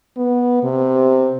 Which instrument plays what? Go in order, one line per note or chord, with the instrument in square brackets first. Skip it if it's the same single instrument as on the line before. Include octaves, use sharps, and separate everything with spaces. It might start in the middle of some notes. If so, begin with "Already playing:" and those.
[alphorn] B3
C3